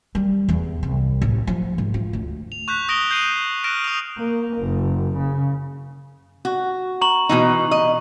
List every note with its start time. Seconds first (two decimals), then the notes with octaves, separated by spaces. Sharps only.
0.15 G3
0.48 E2
0.83 C2
1.22 A1
1.47 F3
1.78 G#2
1.94 F4
2.13 D2
2.52 F7
2.68 C#6 F#6 G6 B6
2.89 D#6 A#6 D7 F7 G7
3.10 D#6 G6 C7 D#7
3.64 F6 F#6 A#6 D7 E7
3.84 D#6 F7
4.17 A#3
4.58 F#1
5.17 C#3
6.45 F#4
7.01 A#5 C#6 F#7
7.29 B2 E3 D#4
7.71 D#5